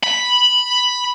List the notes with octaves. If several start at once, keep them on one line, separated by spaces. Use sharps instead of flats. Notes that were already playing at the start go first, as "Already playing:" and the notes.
B5